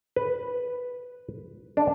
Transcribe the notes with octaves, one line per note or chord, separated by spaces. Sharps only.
B4
D4